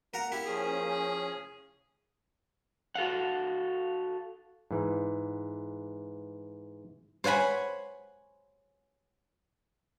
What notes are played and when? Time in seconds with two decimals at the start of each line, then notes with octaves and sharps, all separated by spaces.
0.14 A#3 A#4 F#5 A#5
0.32 E4 G4
0.46 F3 C#4 G#4
2.95 F#4 A4 F5 F#5
4.71 G#2 E3
7.24 C5 C#5 F#5 G#5 B5